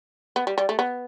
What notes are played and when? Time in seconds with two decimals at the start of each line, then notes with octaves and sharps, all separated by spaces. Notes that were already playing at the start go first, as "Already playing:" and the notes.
0.36 B3
0.47 G3
0.58 G3
0.69 A3
0.79 B3